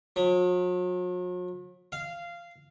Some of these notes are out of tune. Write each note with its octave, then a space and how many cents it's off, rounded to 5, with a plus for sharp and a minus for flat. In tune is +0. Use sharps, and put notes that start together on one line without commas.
F#3 -45
F5 -15